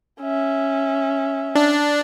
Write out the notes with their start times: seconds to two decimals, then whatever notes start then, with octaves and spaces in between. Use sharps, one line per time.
0.21 C#4 E5
1.55 D4